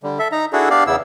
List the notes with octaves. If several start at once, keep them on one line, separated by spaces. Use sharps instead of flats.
D3 G3
A4 E5
D#4 A#5
D4 E4 F#4 G#4 A4
B3 D4 G4 D5 F5
E2 C#3 B3 E4 E6